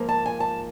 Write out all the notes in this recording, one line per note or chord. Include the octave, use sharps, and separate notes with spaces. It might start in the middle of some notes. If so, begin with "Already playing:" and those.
Already playing: G#2 F3 A#3
A5
G#5
A5